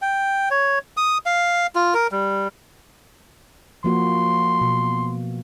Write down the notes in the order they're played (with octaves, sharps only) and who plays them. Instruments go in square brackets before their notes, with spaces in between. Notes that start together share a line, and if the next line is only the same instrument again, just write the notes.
[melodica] G5
C#5
D#6
F5
F4
A#4
G3
[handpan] F3 A#3 F#4 [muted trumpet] C6
[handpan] B2